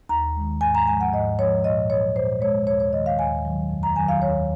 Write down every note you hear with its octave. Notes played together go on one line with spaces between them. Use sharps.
D#2 A#5
D#3 G#3
G#2 G#5
A#5
F3 G#3 G#5
F#5
G#2 D#5
F3 G#3 C#5
A#2 D#5
F#3 C#5
A#2 C5
G#3 C#5
D#2 C#5
C#5
D#3 G#3 D#5
F5
D#2 G#5
D#3 F#3
F2
A#5
D#3 F#3 G#5
F5
D#2 C#5